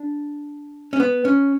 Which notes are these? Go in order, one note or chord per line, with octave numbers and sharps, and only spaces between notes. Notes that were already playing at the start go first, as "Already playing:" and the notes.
Already playing: D4
C#4
B3
C#4